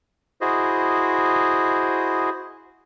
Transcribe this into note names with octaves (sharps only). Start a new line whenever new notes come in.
E4 F#4 G#4 C5 D#5